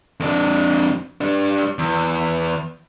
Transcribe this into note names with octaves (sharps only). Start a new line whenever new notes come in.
F2 D4
G3 D4
E2